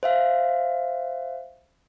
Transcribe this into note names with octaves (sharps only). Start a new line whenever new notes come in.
C5 E5 F5